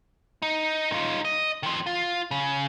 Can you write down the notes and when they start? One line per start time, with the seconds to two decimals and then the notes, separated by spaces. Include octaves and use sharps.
0.42 D#4
0.92 D#4 F4
1.25 D#5
1.63 D#3 F3
1.86 F4
2.31 C#3